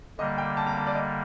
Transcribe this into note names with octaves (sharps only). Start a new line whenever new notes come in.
D3 G3 A#3 D#5
G5
A5
A#5
A5
D5
D#5